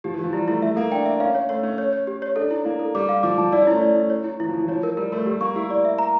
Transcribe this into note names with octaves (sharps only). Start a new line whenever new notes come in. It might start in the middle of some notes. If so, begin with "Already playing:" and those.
F3 G4
E3
F3 G4
G3 E4
A3 E4
A3 E5
A#3 A4
D4 G5
E5
C#4 F5
C#5
A3 C#5
C#4 C#5
C#5
C#5
G4
C#5
D4 A4
E4
A#3 E4
A4
G3 D6
F5
F3 D6
F3 A5
E4 D5
C#4
A3 E4
D5
E4
C#5
E4
E3 E4
F3
E4
E3
F3 C#5
A#4
G3 A#4
A3 A#4
G3 G4
A#3 C#6
E4 G4
D5
E5
A#5